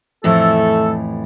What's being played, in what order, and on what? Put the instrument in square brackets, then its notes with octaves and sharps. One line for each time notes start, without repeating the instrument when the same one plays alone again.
[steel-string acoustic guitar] F2 A2 E3 [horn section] A3 A4